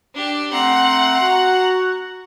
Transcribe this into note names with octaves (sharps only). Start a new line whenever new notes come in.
D4 G4
A3 C4 F#5 A#5 C6
F#4